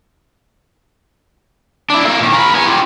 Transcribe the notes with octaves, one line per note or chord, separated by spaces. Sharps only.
D4 E4
A#3 A4
A#2 D#3
A#4 B5
B3 G#5
F4 G4